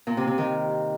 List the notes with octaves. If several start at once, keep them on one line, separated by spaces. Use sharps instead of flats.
A#2
C3
C3
D#3